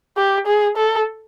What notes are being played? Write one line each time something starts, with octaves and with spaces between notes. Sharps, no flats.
G4
G#4
A4